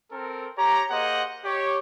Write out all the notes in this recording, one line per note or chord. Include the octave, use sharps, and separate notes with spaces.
C4 A4 A#4
G4 C#5 A#5
A#3 G#4 C5 D#5 F#5
G4 C#5